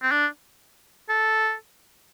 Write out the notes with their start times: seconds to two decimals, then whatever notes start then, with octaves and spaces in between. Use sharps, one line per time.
0.02 C4
0.12 D4
1.09 A4